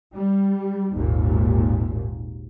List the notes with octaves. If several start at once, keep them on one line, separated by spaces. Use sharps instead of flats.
G3
G#1 D#2 A#2